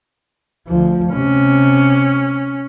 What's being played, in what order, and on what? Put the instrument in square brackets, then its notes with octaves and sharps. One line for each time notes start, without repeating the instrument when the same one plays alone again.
[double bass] D2 F3
[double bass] C3 [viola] C#4